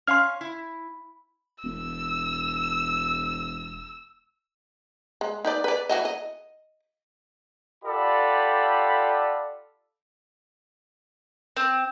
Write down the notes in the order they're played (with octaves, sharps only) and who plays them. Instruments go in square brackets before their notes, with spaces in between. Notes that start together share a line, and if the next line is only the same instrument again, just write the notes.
[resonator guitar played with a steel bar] C#4 C#5 F5 [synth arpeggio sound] C6 F6
[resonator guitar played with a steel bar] E4
[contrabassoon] E1 [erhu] E6
[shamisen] G#3
D#4 B4 D5
B4 D5
E3 F#4 D#5
D#5
[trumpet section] F4 G4 A4 D5 F#5 B5
[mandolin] C4